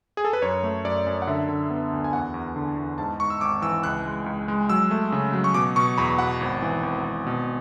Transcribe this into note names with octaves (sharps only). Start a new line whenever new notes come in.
G#4
A4
B4
F#2 C#5
A3
F#2 D5
F#2
F#5
D3 E5
D3
B3
D2
G#5
E2 F#5
E2
D3
E2
G#2 A5
G#2 C#6
E6
G#1 D6
E3 E6
C#2 F#6
G#3
C#2
G#3
F#3 E6
A3
C#3
F#3
C#6
B2 D6
B2 C#6
E2 B5
B2 F#5
G#1
E3
G#1
G#1
B2